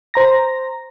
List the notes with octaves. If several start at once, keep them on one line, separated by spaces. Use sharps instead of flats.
C5 A#5 A#6